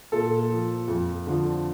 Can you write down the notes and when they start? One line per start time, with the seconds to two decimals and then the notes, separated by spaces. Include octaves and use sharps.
0.12 A#2 A4
0.50 F3
0.88 F2
1.27 D3 F3